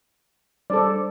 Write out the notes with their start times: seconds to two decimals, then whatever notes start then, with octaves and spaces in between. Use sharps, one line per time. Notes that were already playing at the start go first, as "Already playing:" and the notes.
0.70 G3 D4 A4 C5 D5